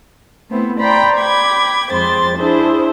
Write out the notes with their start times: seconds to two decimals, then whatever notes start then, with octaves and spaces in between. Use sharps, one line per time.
0.50 A3 B3 C4 E4
0.79 C5 D5 G5 A#5 B5
1.19 G5 B5 D6 G#6
1.90 F2 G#3 C4 C5 C6 A6
2.37 D4 E4 G#4 C5